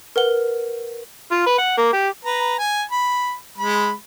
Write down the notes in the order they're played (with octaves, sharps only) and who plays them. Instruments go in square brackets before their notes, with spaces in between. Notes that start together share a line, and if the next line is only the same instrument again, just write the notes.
[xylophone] A#4 B4 F#5 G7
[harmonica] F4
B4
F#5
A#3
G4
B4 A#5
G#5
B5
G#3 B5